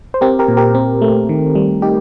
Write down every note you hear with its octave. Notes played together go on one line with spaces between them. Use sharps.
C5
C4 G4 A#4
G4 A#4
A#2
G4 A#4
C4
A3
D#3
G3
D#4 G4